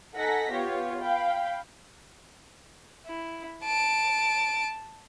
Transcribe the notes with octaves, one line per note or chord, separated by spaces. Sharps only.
D#4 A4 F#5 G#5 A#6 B6
B3 F4 G4 C#5
F5 G5 B5
E4
A5 D7